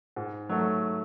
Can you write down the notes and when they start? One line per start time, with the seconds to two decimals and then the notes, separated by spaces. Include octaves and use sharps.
0.16 G#2
0.49 F#3 A3